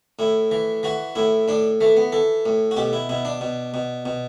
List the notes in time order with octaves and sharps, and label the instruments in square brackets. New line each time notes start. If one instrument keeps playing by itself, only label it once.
[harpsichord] A2 E4
E3
E3 F#4
A2 E4
A2 D4
E3 A3
B3
E3 A4
A2
F#4
B2 G4
E4
B2 E4
D4
B2
B2
B2